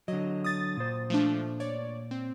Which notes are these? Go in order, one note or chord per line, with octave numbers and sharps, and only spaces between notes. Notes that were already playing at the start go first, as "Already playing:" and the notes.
D3 F#3 D#5
D#6 A6
A#2 C5
F3 A3 D4
C#5 D5
C4